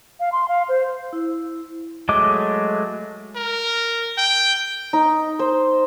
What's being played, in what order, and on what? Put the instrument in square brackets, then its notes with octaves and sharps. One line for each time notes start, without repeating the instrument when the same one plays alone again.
[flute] F5
C6
F5
C5
[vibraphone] E4
[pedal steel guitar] F#3 G#3 A3 D#5 D6
[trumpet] A#4
G5
[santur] D#4
C5